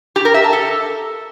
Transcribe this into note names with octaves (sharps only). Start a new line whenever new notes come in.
G4
A#4
E5
A5
A4